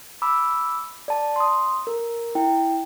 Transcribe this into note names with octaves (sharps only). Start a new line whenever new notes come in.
B5 D6 E6
D5 A5
C6 D#6
A#4
E4 G5